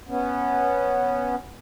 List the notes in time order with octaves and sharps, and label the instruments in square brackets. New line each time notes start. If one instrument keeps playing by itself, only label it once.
[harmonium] B3 C#4